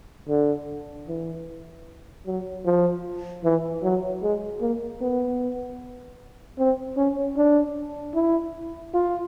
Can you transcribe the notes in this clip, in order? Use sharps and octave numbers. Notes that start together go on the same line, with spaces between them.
D3
E3
F#3
F3
E3
F#3
G#3
A#3
B3
C4
C#4
D4
E4
F4